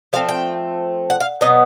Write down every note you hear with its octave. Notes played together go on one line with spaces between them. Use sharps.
F3 A3 C4 F5
G5
F#5
F5
B2 F#3 B3 D#5